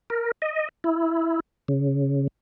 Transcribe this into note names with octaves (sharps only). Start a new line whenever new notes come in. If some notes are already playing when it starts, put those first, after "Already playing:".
A#4
D#5
E4
C#3